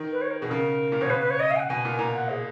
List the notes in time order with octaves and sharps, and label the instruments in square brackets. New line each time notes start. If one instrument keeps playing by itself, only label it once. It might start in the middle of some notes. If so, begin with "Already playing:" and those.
Already playing: [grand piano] D#3
[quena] B4
C#5
A#4
[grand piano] B2 [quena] G#4
[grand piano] C#3 [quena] A#4
[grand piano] A#2
[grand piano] B2 [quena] C#5
[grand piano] C#3 [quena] B4
[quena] B4
C#5
D#5
F5
G#5
F#5
[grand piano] B2 [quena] G#5
[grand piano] A#2
[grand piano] A#2 [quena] A#5
[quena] F#5
G#4